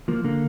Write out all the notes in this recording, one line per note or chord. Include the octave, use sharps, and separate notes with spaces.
F3 A#3
D3 A#3